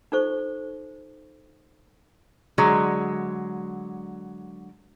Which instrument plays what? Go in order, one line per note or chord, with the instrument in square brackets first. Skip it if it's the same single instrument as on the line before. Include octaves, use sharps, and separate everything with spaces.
[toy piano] D#4 F4 A4 C5 C#6
[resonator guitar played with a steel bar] D3 F#3 G#3